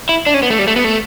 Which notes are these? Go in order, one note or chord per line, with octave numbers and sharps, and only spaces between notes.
E4
D4
C#4
B3
A3
G3
A3
B3
A3